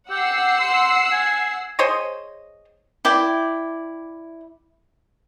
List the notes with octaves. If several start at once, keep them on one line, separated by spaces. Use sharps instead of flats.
G4 F#5 E6 C7
C6
G#5
G#4 C5 C#5 D#5
E4 D5 G5